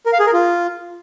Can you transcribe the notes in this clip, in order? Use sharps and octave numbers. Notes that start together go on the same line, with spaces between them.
A#4
F5
G#4
A#4
F4